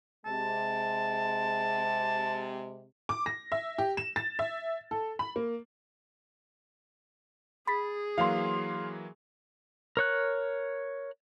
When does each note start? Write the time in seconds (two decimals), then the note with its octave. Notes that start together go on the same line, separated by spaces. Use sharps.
0.26 C3 G#3 A5
3.09 D6
3.26 A#6
3.52 E5
3.78 G4
3.97 E7
4.16 A6
4.39 E5
4.91 A4
5.19 B5
5.36 A#3
7.67 G#4 B5 A6 B6
8.18 E3 F#3 A#3 F5 C6
9.97 A#4 C#5 F#6